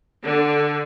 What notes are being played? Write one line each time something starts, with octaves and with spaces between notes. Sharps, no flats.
D3